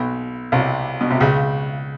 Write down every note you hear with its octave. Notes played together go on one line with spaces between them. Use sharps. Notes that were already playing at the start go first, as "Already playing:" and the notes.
Already playing: B1 B2
C2 C3
B2
C3
C#2 C#3